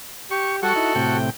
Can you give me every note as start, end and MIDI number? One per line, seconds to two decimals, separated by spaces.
0.31 0.60 67
0.31 0.56 85
0.63 0.73 55
0.63 1.17 66
0.63 1.17 69
0.63 1.17 78
0.63 0.73 85
0.76 0.93 63
0.76 0.93 64
0.95 1.30 45
0.95 1.30 48
0.95 1.30 79